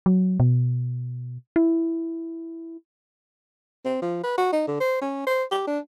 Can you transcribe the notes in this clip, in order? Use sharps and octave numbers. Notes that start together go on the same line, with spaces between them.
F#3
B2
E4
C4
F3
B4
F#4
D#4
D3
C5
C#4
C5
G4
D4